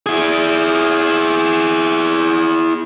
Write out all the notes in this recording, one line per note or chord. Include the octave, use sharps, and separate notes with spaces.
E4 G#4